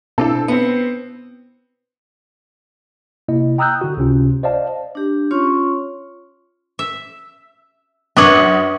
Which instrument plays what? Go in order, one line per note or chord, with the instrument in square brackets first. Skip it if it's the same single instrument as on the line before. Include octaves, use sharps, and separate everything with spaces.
[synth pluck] B2 D4 E4 [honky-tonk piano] C4 A4
[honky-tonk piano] B3 C4 [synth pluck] C#7
[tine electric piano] C3 A#3 E4 D#5
G5 A#5 D#6 E6 F#6 G6
D3 F#4
C#2 C3 C#4 F4
C5 D5 D#5 F5 A5
[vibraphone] D4 G4
C#4 F4 C#5 C6 C#6
[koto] E5
[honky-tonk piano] F#2 D#6 F#7 [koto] D4 B4 C#5